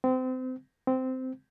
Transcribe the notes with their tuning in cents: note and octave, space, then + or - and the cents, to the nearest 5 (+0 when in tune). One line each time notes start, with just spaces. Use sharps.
C4 -30
C4 -15